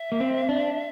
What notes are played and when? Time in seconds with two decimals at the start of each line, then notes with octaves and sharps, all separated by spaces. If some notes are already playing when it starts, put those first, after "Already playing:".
Already playing: E5
0.12 A#3
0.20 C4
0.49 D4